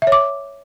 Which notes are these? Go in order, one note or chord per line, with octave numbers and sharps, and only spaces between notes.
E5
C#5
D6